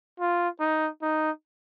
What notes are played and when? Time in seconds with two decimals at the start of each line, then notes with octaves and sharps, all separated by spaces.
0.20 F4
0.60 D#4
1.02 D#4